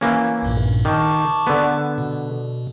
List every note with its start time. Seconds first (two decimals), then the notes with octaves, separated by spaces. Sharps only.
0.01 E3 A#3 C#4
0.42 A#1 G2 A#2
0.85 D#3 A5 C#6 D6
1.47 D3 B3
1.98 B2